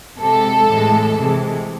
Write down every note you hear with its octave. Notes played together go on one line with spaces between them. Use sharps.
C3 G#3 A4
A2 E3 G#3
C3 E3 G#3